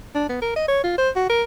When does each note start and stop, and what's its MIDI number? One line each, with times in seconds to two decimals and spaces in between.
0.15 0.29 62
0.29 0.40 59
0.42 0.53 70
0.56 0.66 75
0.68 0.82 73
0.84 0.97 65
0.98 1.10 72
1.16 1.24 66
1.29 1.43 70